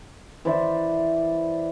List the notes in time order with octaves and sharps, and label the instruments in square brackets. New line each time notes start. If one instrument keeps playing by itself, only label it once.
[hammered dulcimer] E3 C5 D5 E5